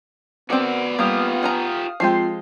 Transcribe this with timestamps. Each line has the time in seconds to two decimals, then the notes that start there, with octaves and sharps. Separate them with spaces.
0.50 B3 C4 F#4 A#4 D5
0.99 G3 A#3 F4 G4 F5 D#6 F6
1.43 F#5 G#5 A#5
2.00 F3 G#3 C4 F4 G4 C7